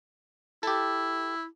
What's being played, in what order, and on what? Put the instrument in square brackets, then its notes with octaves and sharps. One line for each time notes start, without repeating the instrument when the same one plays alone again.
[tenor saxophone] E4 [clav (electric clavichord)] G4 A4